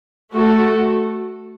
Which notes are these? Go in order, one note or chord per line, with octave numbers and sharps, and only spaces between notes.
A3 F#4 A4